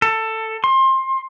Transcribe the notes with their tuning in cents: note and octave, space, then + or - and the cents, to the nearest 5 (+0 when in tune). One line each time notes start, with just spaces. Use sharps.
A4 +15
C6 +25